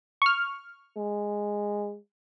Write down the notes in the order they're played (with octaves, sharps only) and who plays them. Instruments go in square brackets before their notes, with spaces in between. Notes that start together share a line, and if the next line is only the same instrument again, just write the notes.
[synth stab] C#6 F6
[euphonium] G#3